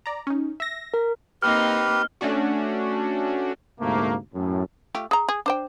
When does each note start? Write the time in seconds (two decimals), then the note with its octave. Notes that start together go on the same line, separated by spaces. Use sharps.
0.06 D5 A#5
0.27 C#4 D#4
0.60 E5 A#6
0.94 A#4
1.42 A#3 C4 D#4 G4 B4 F6
2.21 A3 C#4 D4 F#4
3.80 D2 G#2 C3 A3 A#3
4.34 F#2 A2
4.95 A3 F4 G4
5.11 G#4 A#5
5.29 G#4
5.46 D4 C5 G5